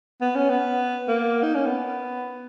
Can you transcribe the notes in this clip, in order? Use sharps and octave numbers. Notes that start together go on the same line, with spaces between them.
B3
C#4
B3
A#3
D#4
C#4
B3